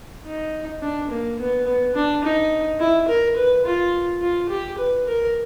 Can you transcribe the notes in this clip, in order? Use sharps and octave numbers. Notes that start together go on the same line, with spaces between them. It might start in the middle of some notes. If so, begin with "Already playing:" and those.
D#4
D4
A#3
B3
B3
D4
D#4
E4
A#4
B4
F4
F4
G4
B4
A#4